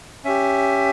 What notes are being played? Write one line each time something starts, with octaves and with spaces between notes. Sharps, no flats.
C#4 G4 E5